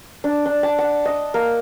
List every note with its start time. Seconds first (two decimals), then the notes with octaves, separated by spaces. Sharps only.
0.24 D4
0.46 D4
0.63 A5
0.78 F#5
1.05 D#5
1.34 A#3